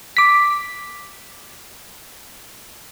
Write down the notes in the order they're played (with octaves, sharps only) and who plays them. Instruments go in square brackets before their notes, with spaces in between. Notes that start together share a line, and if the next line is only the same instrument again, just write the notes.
[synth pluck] D6 B6